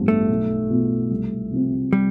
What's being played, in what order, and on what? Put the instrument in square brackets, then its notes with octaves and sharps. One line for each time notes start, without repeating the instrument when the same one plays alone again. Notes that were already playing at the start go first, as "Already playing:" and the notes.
Already playing: [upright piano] A1 G2 F3 B3 F4
[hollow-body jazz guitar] A3
[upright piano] B1
B2 B3 F4
C2
C3 F3 C4
[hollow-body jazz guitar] G3